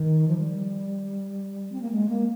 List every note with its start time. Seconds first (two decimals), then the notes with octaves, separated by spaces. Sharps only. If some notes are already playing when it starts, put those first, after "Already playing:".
Already playing: D#3
0.28 F3
0.38 G3
1.72 C4
1.82 A#3
1.91 G#3
2.09 A#3